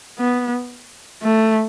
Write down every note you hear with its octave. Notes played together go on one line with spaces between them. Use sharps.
B3
A3